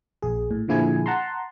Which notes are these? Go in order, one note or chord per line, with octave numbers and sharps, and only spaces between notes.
A#1 G#4
A2
A#2 D3 F3 E4 G#4 G#5
F#5 A5 A#5 C6